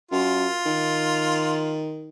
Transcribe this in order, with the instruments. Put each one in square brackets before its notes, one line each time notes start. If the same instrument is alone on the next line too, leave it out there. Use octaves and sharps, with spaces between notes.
[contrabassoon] F#2 [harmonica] F4
[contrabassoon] D#3